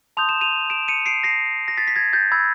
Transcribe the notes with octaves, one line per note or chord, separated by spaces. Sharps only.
A5 C6 D#6 G6 F7
E7
D#7 F7
D7 E7
C#7 D#7
C7 D7
A#6 C7
A#6
A6 B6
B6
G#6 A#6
G6 A6
B5 E6 G6 G#6